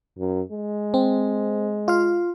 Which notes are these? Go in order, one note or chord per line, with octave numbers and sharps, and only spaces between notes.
F#2
G#3
C4
F4 F5